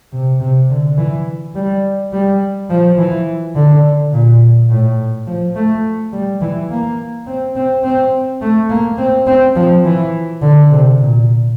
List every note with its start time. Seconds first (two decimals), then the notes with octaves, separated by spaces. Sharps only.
0.12 C3
0.40 C3
0.70 D3
0.97 E3
1.55 G3
2.12 G3
2.70 F3
2.98 E3
3.55 D3
4.12 A#2
4.70 A2
5.27 F3
5.55 A3
6.12 G3
6.41 E3
6.70 A#3
7.26 C4
7.56 C4
7.84 C4
8.41 A3
8.70 A#3
8.98 C4
9.27 C4
9.55 F3
9.85 E3
10.42 D3
10.70 C3
10.98 A#2